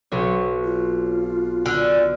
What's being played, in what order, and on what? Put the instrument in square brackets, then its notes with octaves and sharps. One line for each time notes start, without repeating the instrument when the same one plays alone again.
[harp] B1 C4 C#5
[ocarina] F4
[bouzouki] D3 [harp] F6